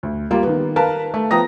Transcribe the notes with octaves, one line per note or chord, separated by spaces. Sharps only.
D2
G3 A#3 F4
D#3 B3
A#4 B4 F5 A5
A3
F3 B3 G5 A#5 D#6 A#6